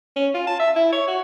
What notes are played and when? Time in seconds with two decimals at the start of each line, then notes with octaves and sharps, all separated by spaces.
0.16 C#4
0.34 F4
0.47 A5
0.60 E5
0.76 E4
0.93 C#5
1.08 F#4